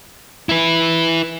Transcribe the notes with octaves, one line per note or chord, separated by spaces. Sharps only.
E4 B4